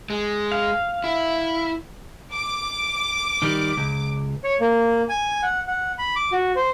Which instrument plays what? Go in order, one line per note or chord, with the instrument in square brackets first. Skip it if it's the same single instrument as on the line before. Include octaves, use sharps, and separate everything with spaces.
[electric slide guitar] G#3
[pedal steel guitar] F5
[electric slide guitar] E4
[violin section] D6
[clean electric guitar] D#3 G3
C#2
[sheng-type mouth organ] C#5
A#3
G#5
F#5
F#5
B5
D6
F#4
C5